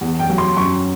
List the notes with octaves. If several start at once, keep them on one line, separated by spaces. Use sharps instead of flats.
E2
G5
F#3
C6
F#2 C#6